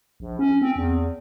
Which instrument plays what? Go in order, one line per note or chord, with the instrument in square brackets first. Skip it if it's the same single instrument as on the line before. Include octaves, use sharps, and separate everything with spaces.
[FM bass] A#1
C#4
C4
E2